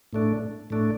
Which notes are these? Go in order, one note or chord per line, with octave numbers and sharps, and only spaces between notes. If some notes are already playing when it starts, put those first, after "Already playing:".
A2 A3 D4
A2 A3 D4